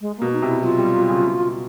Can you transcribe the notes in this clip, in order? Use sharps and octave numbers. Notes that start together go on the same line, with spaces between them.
G#3
B2 A#3
D#4
C3
E4
F#3 F4
G3
F#3
C#3
B2